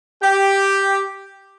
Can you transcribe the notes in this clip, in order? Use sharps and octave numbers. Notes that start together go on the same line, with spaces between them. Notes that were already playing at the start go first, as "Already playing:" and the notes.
G4